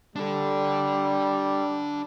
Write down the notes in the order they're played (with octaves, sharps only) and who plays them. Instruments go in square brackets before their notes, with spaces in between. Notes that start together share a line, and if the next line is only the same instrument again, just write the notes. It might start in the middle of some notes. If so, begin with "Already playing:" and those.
[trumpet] G3 [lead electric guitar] D4 A4